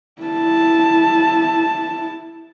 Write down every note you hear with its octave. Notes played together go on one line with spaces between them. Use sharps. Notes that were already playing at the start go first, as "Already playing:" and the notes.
E4 A5